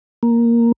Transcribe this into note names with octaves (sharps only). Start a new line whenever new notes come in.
A#3